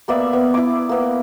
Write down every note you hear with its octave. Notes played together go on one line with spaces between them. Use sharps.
A#3 B3 D5 E5
B3
E4 D6
A#3 B3